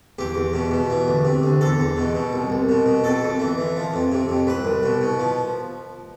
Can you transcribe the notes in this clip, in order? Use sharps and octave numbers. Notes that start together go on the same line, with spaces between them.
E2 G4
E2
B2
B2
E3
D2
C3
D2
E2 A4
E2
B2
B2
C2
C2
B2
B2
F2 A4
F2
E3
E3
F3
F2
C3
F2
C2 B4
C2
B2
B2
F3